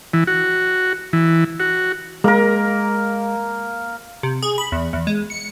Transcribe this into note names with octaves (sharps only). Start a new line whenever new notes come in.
E3
F#4
E3
F#4
G#3 A#3 A#4
C3
G#4
B5
E2
E2
G#3
C#7